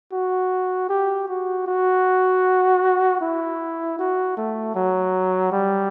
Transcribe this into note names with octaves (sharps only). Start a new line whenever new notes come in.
F#4
G4
F#4
F#4
E4
F#4
A3
F#3
G3